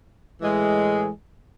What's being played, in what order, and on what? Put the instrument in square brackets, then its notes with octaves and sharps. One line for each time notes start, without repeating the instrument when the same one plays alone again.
[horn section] A2 E3 G#3